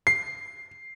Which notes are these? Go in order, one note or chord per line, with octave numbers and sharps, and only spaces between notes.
C7